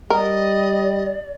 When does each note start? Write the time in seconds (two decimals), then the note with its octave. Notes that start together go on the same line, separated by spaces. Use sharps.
0.10 G3 A#4 D5 D#5